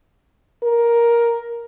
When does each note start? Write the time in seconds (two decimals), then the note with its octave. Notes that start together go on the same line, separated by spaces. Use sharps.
0.63 A#4